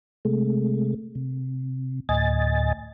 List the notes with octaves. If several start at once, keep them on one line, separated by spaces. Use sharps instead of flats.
C3 G#3 A3
C3
D2 A2 D#5 G#5 A6